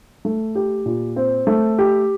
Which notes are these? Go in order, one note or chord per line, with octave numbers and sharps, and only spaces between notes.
A3
G4
A#2
C4
A3
G4